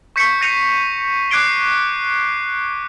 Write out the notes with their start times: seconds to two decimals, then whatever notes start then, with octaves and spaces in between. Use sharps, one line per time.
0.16 C#6 G6 B6 C#7
0.41 G6 A#6 C7 C#7 D#7 F7
1.31 D6 F#6 G#6 C7 D7 G7